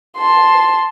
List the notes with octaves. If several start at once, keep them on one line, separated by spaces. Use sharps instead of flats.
A5 C6